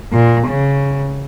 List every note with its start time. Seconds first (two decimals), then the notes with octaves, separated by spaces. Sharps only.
0.12 A#2
0.48 C#3